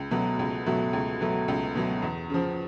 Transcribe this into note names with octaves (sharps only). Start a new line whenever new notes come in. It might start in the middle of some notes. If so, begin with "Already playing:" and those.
Already playing: C#2
B2 F#3 A3
C#2
B2 F#3 A3
C#2
B2 F#3 A3
C#2
B2 F#3 A3
E2
C#3 F3